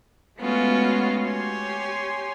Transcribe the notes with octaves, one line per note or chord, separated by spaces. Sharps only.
G#3 A3 B3 C#4 F4 F#4
G4 C#5 G#5 C6